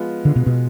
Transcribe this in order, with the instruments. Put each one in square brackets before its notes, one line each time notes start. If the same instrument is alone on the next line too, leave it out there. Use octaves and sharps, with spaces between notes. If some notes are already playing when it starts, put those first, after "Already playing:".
Already playing: [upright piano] F3 G#3 B3 F4
[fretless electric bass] D3
B2
B2